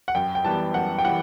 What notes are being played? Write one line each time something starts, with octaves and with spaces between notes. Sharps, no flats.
F#5
F#2 G5
G5
E3 G3 B3 A5
F#2 F#5
G5
E3 G3 F#5